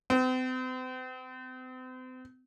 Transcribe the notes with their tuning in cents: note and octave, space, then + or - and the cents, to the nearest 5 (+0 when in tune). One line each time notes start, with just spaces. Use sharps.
C4 -40